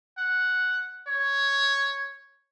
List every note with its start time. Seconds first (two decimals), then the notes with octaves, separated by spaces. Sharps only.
0.18 F#5
1.07 C#5